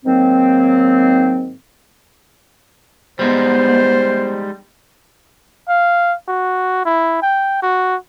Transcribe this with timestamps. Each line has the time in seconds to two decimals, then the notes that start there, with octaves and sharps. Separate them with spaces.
0.05 G#2 D#3 F#3 A#3 C4
3.19 G3 G#3 B3 D#4 C5
5.69 F5
6.28 F#4
6.85 E4
7.22 G5
7.62 F#4